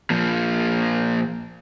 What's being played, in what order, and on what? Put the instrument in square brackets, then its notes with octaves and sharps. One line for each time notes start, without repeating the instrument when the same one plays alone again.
[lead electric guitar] A#2 F3